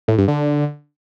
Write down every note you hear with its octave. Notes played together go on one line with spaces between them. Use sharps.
A2
G2
D3